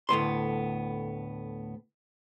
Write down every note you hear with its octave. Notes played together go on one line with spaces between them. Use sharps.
D2 A2 B3 C6